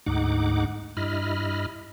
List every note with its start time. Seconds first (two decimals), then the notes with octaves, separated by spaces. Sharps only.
0.06 D2 G#2 D#4 F#5 D6
0.97 G2 E4 D#5 B5 F6